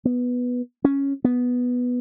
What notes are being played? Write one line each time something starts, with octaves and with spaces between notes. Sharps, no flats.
B3
C#4
B3